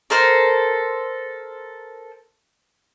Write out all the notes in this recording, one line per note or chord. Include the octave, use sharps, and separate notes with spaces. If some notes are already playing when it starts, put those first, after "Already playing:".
A4 A#4 C5